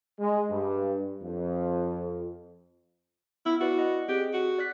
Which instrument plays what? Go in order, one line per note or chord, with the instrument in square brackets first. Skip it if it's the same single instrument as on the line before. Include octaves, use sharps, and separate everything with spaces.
[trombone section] G#3
G2
F2
[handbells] B3 [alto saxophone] E4
[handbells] E4 B4 D5 [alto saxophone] F#4
[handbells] D#5 F#5
[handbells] C4 G#4 [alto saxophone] G4
[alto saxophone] F#4
[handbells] D5 F#6 B6